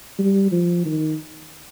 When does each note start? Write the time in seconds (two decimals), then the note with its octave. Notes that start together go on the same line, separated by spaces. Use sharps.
0.19 G3
0.52 F3
0.86 D#3